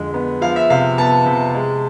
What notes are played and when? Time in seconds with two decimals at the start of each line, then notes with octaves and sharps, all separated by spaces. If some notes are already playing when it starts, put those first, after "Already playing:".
Already playing: F2 D3 G#3
0.14 B3
0.42 F3 F5
0.56 E5
0.70 C3 F5
0.98 B3 A5
1.26 C3
1.54 G#3